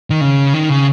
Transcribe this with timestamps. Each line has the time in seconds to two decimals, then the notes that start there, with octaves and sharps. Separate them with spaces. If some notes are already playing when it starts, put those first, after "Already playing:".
0.10 D#3
0.21 C#3
0.54 D#3
0.70 C#3